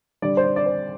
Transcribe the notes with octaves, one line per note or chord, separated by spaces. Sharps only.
D3 G3 D5
C5
D5
D5
C5